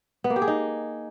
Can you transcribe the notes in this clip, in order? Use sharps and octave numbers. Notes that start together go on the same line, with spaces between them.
B3
A#3
G4
G#4
D#4